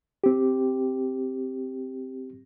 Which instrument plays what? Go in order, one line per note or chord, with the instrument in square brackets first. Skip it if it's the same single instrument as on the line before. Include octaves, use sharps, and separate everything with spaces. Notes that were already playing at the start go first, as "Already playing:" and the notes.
[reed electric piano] C4 G4